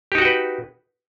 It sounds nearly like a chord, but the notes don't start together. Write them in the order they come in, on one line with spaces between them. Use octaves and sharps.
G4 D#4 F#4 G5 B4